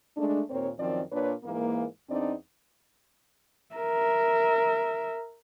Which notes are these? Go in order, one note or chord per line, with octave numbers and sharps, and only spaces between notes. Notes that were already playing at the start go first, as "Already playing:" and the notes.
G#3 A3 D4
D#2 A#2 C4 A#4 C#5
F#2 D#3 F3 C4 D5
A#2 A#3 D4 B4 C#5
G#2 E3 A#3
E2 C4 D4 D#4 D5
A#4 E5